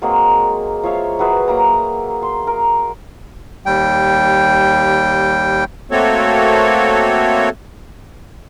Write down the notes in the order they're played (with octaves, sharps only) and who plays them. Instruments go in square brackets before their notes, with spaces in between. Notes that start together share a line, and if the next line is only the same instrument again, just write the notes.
[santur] F#3 G#3 A#3 C4
F3 C#5 E5 F5
F#3 G#4 B4 E5
F#3 A#3 A#5
C6
A#4
[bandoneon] D#2 G3 G5
[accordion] A3 A#3 C4 F#4 A4 C#5